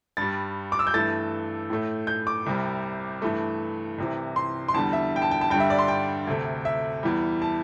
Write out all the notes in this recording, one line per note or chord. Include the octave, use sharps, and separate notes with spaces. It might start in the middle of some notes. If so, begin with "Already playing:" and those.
G2 G3 A6
D6
E6
G6
G2 E3 A3 A6
A2 A3
G6
D6
C2 C3 G3
G2 E3 A3
C2 C3 E3
C6
C6
E2 D3 G3 A5
E5
G5
A5
G5
A5
G2 D3 G3 G5
E5
D5
C6
G5
D2 C3 A3
E5
E2 E3 G3
A5